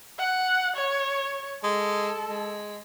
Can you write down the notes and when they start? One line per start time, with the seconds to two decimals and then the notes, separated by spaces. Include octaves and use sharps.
0.19 F#5
0.76 C#5
1.64 G#3 A4
2.29 G#3